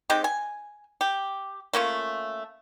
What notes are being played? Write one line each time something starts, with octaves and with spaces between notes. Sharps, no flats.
G#3 C4 D#4 G4
G#5
G4
A3 A#3 C#4 F4